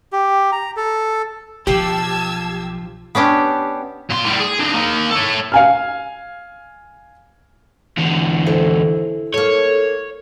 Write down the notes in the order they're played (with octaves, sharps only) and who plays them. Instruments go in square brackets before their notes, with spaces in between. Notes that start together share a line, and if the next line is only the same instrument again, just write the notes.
[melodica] G4
A#5
A4
[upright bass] B1 [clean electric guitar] F3 F4 [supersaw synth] G4 [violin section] A5 E6 G#6
[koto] B3 C#4 D4 G4
[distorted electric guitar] A#2 C6
A2 G3
G#4
D4 D#4
A#3 D#4
A4 C#5
[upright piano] F5 G#5 F6
[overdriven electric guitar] E2 D3
[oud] E4 A4 C5
[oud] A#3 A4 [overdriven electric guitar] C#5